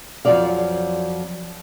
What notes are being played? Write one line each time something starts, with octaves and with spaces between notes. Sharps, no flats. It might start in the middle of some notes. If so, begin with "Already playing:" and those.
F2 D#3 F3 F#3 D5 F5